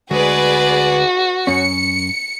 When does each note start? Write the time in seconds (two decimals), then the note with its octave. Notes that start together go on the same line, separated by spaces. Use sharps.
0.11 D2 G#3 F#4 G#4 B4 D5
1.47 F#2 C#4 C#7